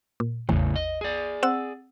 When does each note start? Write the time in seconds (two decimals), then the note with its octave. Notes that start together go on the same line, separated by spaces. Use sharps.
0.20 A#2
0.49 A1 E2 A2 C#3
0.76 D#5
1.01 G#4 D5
1.43 C4 F#5 E6